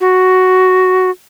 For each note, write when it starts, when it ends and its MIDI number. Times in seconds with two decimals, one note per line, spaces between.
0.01 1.10 66